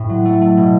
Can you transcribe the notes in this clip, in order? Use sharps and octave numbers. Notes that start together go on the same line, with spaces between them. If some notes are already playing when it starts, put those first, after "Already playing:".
Already playing: A2 C4
F#3
A3
A3
B2